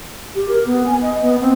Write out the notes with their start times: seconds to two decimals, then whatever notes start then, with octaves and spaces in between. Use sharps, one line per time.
0.35 G4
0.48 A#4
0.66 B3
0.86 G#5
1.02 D#5
1.21 B3
1.41 C4